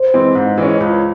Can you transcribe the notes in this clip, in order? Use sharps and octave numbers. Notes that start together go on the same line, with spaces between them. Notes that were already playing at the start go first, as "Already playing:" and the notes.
Already playing: C5
E3 G#3 C4
G#2
E3 G#3 C#4
C#2